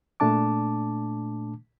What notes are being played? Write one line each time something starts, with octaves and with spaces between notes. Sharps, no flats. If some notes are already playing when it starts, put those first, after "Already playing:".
A#2 A3 D4 A5 D6